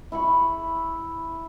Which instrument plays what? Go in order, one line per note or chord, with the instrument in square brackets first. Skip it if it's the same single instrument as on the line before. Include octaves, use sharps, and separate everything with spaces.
[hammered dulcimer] E4 B5 C#6